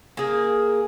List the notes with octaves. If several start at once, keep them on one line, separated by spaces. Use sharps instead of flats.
A#3 G#4